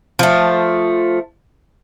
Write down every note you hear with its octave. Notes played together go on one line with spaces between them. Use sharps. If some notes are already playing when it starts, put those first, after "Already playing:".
F3 A3